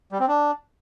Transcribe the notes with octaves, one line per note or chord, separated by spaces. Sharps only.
G3
C4
D4